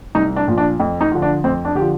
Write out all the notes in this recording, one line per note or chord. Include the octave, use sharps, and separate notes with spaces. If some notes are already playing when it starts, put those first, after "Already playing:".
C2 D#4
D4
A#2 F3
D4
F2
D#4
D3 F3
D4
F2 C4
D4
D3 F3 G4